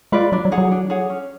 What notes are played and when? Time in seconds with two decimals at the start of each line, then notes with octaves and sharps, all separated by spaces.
0.12 G#3 F4 B4 D5
0.32 F#3 D4
0.45 F#3
0.52 G#4 C#5 F#5
0.58 F#3
0.71 D4
0.90 G#4 C#5 F#5
1.10 C#4